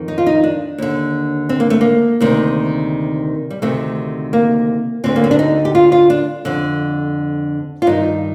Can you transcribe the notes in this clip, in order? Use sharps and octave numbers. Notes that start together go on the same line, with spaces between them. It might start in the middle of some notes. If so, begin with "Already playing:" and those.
Already playing: F2 D#3
D#4
F4
D#4
D4
D#2 D3
C4
A#3
A3
A#3
D2 C3 D#3
G3
D2 C3 D#3 A3
A#3
D2 D3 C4
A#3
C4
D4
D#4
G4
F4
F4
D4
F2 D3
F4
G2 D#3 D#4